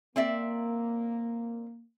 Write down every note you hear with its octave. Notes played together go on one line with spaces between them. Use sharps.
A#3 C4 D5 E5